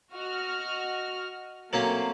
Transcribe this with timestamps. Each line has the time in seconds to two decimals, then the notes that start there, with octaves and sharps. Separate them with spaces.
0.14 F#4 D#5 F6
1.73 F#3 A3 A#3 C4 C#4